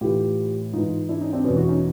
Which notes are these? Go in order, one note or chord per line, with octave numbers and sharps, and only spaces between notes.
A2 E3 F4 G4
G#2 E3 D#4 F4
D4 E4
C#4 D#4
C4 D4
E2 B2 B3 C#4
E4 F#4
C#4 D#4